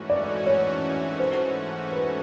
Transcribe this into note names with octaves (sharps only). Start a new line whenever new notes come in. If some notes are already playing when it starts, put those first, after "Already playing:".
Already playing: G#2 E3 A3 C#4 F#4
D5
C#5
C5
B4